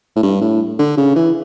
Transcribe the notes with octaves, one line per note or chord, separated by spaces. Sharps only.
A2
G2
A2
D3
C#3
E3